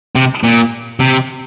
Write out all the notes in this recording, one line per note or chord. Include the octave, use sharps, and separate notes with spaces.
C3
A#2
C3